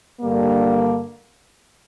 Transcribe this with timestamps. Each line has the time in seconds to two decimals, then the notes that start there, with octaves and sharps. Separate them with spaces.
0.21 G2 D3 G3 A#3